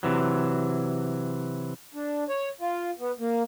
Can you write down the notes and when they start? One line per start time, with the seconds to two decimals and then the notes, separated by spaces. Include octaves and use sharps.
0.03 C3 E3 F#3
1.94 D4
2.29 C#5
2.60 F4
2.99 B3
3.19 A#3